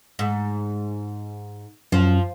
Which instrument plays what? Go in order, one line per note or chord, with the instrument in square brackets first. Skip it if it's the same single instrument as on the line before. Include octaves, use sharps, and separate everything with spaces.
[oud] G#2
[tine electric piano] F#2 [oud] F3